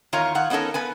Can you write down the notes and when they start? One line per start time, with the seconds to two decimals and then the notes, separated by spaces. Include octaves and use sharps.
0.13 E2 D#3 F4 C#5 F5 A#5
0.35 D#3 F5 F#5
0.50 B3 C#4 D#4 A4 A#4
0.74 B3 B4 G#5